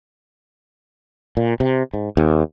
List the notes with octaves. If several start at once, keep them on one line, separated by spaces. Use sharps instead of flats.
A#2
C3
G#2
D#2